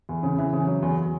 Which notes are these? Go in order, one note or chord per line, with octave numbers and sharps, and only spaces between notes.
E2
C#3
E3
C#3
F#3
E2